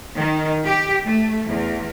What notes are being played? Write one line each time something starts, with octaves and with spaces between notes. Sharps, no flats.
D#3
G4
A3
E2